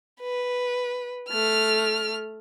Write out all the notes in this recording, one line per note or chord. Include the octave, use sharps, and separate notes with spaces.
B4
A3 F6